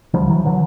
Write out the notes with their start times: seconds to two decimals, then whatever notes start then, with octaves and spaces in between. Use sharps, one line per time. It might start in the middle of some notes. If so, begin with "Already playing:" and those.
0.14 D2 D3 F3 G3
0.29 E3 F#3
0.45 D3 E3 F#3